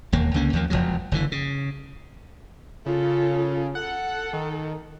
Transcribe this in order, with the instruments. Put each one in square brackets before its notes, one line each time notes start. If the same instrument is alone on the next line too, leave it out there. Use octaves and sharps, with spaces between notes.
[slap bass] E1 D#2 A#3
C#2 D3 A#3 C#4
D#2 F3 A#3
E1 C#2 F3 F#3
F#1 D3 E3
C#3
[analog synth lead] C#3 [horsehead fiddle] F4 A4
[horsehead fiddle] A4 [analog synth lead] F#5
[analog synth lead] D#3